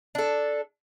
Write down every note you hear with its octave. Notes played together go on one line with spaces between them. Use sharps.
D4 A4